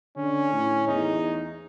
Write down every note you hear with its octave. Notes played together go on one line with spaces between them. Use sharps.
D3 C#4
A2
E2 D#4